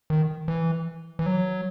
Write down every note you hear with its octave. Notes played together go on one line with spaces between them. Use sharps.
D#3
E3
E3
F#3